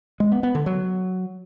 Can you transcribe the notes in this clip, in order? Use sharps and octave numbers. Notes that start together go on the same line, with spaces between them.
G#3
B3
B3
D3
F#3